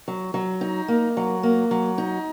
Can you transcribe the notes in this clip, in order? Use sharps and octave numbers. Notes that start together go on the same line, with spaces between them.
F#3
F#3
D#4
A#3
F#3
A#3
F#3
D#4